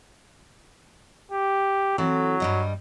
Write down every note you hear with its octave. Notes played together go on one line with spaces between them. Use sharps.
G4
E3 F#3 C4 A4
G2 G3 D#5